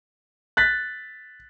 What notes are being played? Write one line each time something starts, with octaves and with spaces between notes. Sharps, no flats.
F#6 A6 B6